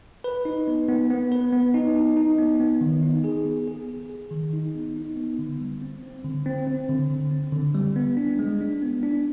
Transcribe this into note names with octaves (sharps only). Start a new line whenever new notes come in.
B4
D#4
B3
B3
B3
B4
B3
D#4
D#4
D#4
B3
B3
D#3
D#4
G#4
B3
G#4
G#4
G#4
D#3
D#4
B3
D#4
B3
D3
G3
C4
C4
D3
C4
C4
D3
D3
C4
D3
G3
B3
D4
G#3
D4
B3
D4